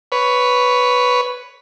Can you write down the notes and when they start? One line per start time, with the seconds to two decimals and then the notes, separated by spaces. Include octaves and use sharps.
0.12 B4 C#5